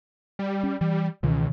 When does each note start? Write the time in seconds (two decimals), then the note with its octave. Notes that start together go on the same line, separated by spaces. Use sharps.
0.39 G3
0.63 C#4
0.81 E3 G3
1.23 C#2 B2 D#3 E3